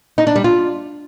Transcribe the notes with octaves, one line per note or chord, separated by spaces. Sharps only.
D#4
D4
G3
F4